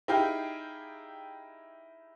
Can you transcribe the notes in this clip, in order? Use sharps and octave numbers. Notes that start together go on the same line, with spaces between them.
D#4 E4 G4 G#4 F5 G5